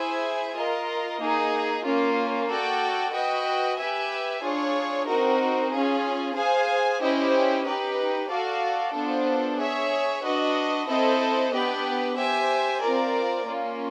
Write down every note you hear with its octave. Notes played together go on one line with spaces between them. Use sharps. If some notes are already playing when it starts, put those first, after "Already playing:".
Already playing: E4 G#4 C5 E5 G#5
F4 A#4 D#5
A#3 D#4 G#4
A#3 C#4 F4
F#4 A4 D5 G5
F#4 B4 D#5 G5
G4 B4 E5 G#5
D4 F4 G#4 C#5
C4 D#4 F#4 A#4
C#4 F4 G#4
G#4 C5 F5 G#5
C#4 E4 G4 C5 D#5
D#4 G4 B4
F#4 A4 D5 F5
B3 D4 F4 A4 C5
G#4 C#5 E5
D4 F#4 B4 D#5
C4 E4 A4 C5 D#5
B3 D4 G4 B4
G4 C5 E5 G#5
C4 F4 A#4 D5
A#3 C#4 F4